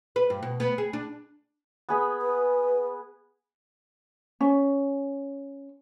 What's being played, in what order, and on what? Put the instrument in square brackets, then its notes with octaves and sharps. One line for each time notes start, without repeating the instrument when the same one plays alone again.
[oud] B4
G2
B2
B3
G#4
D4
[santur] B3 G#4 B5
[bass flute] B4
[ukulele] C#4